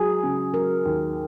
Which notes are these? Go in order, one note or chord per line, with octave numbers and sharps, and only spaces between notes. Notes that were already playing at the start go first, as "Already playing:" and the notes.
Already playing: F#3 G#4
C#3
F#3 A#4
D#2